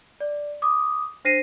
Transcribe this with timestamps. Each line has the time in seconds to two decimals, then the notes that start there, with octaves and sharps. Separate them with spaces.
0.20 D5
0.62 D6 D#6
1.25 D4 C5 A#6 C7 D#7